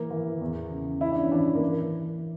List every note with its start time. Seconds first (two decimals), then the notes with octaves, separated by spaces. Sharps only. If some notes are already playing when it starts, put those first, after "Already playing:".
Already playing: E3 A#3
0.10 E3
0.41 E2
0.71 C#3
1.01 E3 E4
1.12 D4
1.22 C#4
1.32 E3 D4
1.55 A#3
1.62 E3